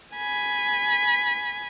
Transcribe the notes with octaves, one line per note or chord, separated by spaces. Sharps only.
G#5 B5